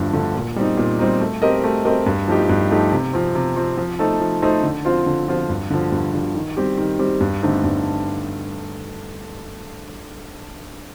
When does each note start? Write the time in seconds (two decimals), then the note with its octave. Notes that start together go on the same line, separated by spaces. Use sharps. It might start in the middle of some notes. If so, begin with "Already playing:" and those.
Already playing: G2 D3 F3 A3
0.13 D3 F3 A3
0.35 A#2
0.56 G3 C4 D#4
0.77 A#2
0.99 G3 C4 D#4
1.21 A3
1.42 C4 G4 A#4 D#5
1.64 A3
1.85 C4 G4 A#4 D#5
2.06 G2
2.28 F3 A3 D#4 G4
2.49 G2
2.71 F3 A3 D#4 G4
2.92 C3
3.13 F3 C4
3.35 C3
3.56 F3 C4
3.77 F3
3.99 A3 D#4 A4 C5
4.20 F3
4.42 A3 D#4 A4 C5
4.63 D3
4.85 F3 C4 F4 C5
5.06 D3
5.28 F3 C4 F4 C5
5.49 G2
5.70 D3 F3
5.92 G2
6.14 D3 F3
6.35 D#3
6.57 G3 C4 G4
6.78 D#3
6.99 G3 C4 G4
7.20 G2
7.42 D3 A3 C4 D#4
7.64 G2